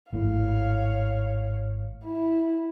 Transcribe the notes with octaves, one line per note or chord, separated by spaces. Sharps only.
G#1 A2 C#5 F5
E4